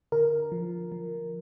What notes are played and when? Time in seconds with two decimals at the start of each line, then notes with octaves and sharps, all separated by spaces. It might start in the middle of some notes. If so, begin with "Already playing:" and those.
0.12 D3 A#4
0.52 F3
0.92 F3